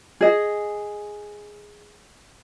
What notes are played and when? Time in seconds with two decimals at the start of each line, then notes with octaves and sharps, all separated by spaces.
0.21 G#4 D#5